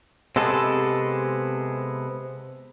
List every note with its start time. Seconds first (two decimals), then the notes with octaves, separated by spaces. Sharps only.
0.36 C3 G#3 B3 A4